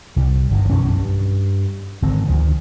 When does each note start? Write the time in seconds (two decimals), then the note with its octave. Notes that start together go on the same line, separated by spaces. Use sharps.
0.16 C2 G3
0.51 G1 D#3
0.70 B1 F#2 E3 C#4
0.95 G2
2.02 G#1 D3 D#3 C4
2.28 D2 D#3 F3